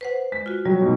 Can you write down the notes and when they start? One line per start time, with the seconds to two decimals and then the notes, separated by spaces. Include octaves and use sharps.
0.01 B4 C5 F#5
0.32 G#3 B6
0.46 F4 F#4
0.65 F#3 G3
0.81 G#2 B2